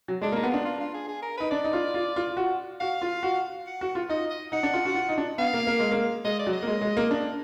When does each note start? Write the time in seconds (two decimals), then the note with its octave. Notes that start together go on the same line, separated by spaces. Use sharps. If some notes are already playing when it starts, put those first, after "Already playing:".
0.08 F#3
0.21 G#3 D4
0.32 A#3
0.36 D#4
0.43 B3
0.51 D4 F4
0.65 F4
0.80 F4
0.94 G#4
1.08 G#4
1.22 A#4
1.37 D#4 B4
1.51 D4 D5
1.64 D#4
1.73 F4
1.94 F4
2.16 F4
2.37 F#4
2.80 F#4 F5
3.02 F4
3.23 F#4
3.67 F#5
3.81 F#4
3.95 F4
4.09 D#4 D#5
4.30 D#5
4.52 D#4 F#5
4.63 D4
4.74 F4
4.85 F#4
4.95 F4
5.09 D#4
5.18 D4
5.38 B3 F5
5.54 A#3
5.67 A#3
5.79 G#3
5.92 A#3
6.25 G#3 D#5
6.39 D5
6.47 F#3
6.53 D#5
6.62 A#3
6.67 G#3
6.81 G#3
6.97 A#3
7.11 D4